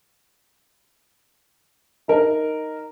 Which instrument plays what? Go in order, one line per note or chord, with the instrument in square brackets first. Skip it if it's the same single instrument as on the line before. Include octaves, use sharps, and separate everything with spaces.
[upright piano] D#4 A#4